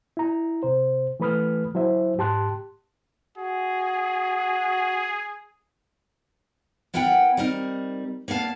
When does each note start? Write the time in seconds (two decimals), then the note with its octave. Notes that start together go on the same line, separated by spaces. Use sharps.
0.17 E4 A#5
0.63 C3 C5
1.20 E3 A3 B4 B5 D#6 F6
1.75 F#3 E4 C5 E5
2.18 G#2 G4 A5 C6 F#6
3.37 F#4 G#4
6.94 B3 E4 A#4 B4 F#5 G5
7.37 G3 C4 D#4 A#4
8.28 A#3 B3 D4 F5 A5